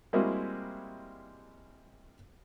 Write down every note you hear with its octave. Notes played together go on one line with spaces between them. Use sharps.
G3 G#3 A#3 C4 E4 F#4